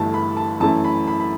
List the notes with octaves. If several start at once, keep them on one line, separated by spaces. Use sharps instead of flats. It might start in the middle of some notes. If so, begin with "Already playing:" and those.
Already playing: G1 G2 E3 A3 A5
B5
A5
F#2 E3 A3 A5
B5
B5
B5